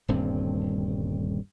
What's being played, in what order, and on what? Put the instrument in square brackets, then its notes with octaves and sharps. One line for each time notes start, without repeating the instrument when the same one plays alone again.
[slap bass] D#1 D2 G2 C4